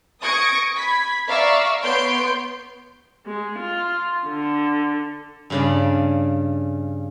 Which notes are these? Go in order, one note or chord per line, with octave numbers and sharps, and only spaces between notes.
C#6 D#6 G#6 A#6 C#7 D7
B5 G#6 B6
D5 E5 F5 A#5 C#6 E6
B3 C#5 C6 G6 D7
G#3
F4
D3
G2 C#3 D5